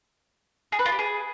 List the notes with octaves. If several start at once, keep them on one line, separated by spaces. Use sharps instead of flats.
G#4
B4
F4
G4
G#4